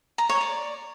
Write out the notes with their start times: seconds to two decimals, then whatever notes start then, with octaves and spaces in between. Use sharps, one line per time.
0.18 A#5
0.29 C#5
0.41 D5